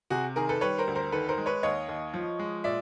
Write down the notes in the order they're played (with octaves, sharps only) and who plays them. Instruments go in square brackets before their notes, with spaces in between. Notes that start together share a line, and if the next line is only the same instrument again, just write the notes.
[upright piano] C3 F#4 G#4
D#3 G#4 A#4
A4 B4
G3 B4 C#5
A#4 C5
D2
A#4 C5
D#3 A4 B4
A#4 C5
G#3
B4 C#5
D#2 C#5 D#5
D#2
F3
G#3
A#2 D5 E5